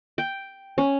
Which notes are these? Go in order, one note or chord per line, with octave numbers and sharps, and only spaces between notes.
G5
C#4